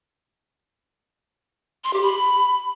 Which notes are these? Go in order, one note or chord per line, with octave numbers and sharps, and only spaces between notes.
C6
G4
B5